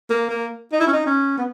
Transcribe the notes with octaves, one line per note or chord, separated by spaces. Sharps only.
A#3
A#3
D#4
E4
C#4
D#4
C#4
B3